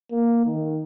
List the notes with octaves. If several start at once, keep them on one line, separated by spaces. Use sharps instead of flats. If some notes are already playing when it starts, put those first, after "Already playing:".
A#3
D#3